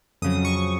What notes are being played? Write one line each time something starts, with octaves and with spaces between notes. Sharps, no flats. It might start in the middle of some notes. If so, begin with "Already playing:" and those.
F2 C#3 F#3 D#6
C#6